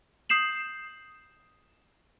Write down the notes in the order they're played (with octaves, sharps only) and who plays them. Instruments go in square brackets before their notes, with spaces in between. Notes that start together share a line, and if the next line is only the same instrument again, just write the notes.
[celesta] D#6 G6 C7 E7 F#7